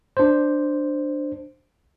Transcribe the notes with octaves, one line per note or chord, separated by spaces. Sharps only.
D4 C5